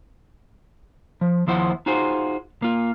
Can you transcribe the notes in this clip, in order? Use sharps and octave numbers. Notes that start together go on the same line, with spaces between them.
F3
D#2 F3 E4 C5 F#5
D#4 F4 F#4 G#4 C5
A#3 F4